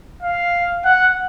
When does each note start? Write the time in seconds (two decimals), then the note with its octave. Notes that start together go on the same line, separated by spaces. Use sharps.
0.23 F5
0.85 F#5